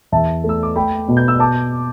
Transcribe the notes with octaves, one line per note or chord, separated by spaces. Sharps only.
E2 E5 A5
A3
E6
D6
A3 G5 B5
B2
G6
E6
A5 D6